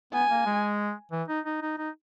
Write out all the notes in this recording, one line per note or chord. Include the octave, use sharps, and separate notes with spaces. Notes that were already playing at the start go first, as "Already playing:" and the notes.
B3 G#5
A#3
G#3
E3
D#4
D#4
D#4
D#4